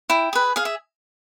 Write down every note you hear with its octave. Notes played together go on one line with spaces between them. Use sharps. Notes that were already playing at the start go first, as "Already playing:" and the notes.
E4 G5
G#4 B4
G#4 F5
E5